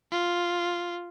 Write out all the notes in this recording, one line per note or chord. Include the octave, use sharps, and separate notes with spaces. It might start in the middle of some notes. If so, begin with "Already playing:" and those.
F4